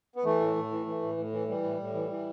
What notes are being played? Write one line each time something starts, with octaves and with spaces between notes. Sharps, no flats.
B3
E3 A3
A2
A2
E3
E3
A2
A2
E3
E3 G3
A2
A2
E3
E3